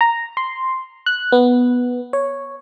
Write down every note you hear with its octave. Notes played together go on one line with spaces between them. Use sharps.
A#5
C6
F#6
B3
C#5